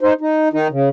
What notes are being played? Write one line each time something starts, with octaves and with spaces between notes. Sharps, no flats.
D#4 C5
D#4
D#3 D#4
C#3